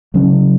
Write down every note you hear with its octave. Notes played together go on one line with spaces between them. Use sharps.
C#3 F#3 C#4